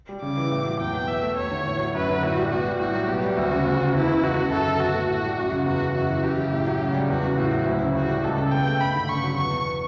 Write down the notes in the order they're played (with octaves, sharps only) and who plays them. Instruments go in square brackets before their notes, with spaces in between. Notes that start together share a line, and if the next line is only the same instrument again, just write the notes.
[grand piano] G3
[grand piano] C#3 [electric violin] D6
[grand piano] E3
A2
F#3
[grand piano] E2 [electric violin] G5
[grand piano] B2
[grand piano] B2 [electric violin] E5
[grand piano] A3
[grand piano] E2 [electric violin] C#5
[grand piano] D3
A2
F#3
[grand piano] F#2 [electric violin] B4
[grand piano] D3
[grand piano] A2 [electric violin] F#4
[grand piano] G3
[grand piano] B2 [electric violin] F#4
[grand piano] G3
[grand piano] A2 [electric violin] F#4
[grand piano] F#3
[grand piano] B2 [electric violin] G4
[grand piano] G3
[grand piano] D2 [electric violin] F#4
[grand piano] C#3
D2
C#3
[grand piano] E2 [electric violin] E4
[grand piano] C#3
[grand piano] C#2 [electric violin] F#4
[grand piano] C#3
[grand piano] F#2 [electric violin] A4
[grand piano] D3
[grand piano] B2 [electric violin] F#4
[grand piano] A3
[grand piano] A2 [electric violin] F#4
[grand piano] G3
F#2
C#3
[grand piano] E2 [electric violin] F#4
[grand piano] C#3
[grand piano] F#2 [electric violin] F#4
[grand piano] E3
[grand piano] F#2 [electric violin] G4
[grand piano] C#3
A2
F#3
C#3
G3
[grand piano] E2 [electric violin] F#4
[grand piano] C#3
[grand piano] A2 [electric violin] F#4
[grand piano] F#3
[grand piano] D2 [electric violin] E4
[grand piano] C#3
[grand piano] A2 [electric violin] F#4
[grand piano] G3
[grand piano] C#2 [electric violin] A4
[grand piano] C#3
[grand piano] B2 [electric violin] G5
[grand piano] A3
[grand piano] G2 [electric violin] B5
[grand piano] D3
[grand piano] C#3 [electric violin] C#6
[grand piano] F#3
[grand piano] E2 [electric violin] C#6
[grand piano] B2